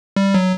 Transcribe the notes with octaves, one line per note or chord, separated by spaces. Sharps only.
G3
F#3